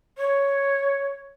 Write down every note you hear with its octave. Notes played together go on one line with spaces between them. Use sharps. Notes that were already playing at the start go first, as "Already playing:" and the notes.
C#5